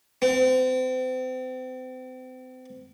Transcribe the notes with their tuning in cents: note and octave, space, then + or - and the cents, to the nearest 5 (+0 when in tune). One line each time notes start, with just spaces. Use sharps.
C4 -35